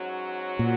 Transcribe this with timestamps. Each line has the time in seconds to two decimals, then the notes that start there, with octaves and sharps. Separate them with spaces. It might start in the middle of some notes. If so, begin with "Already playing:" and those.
Already playing: G#2 F#3 C#4 F#4
0.59 A#2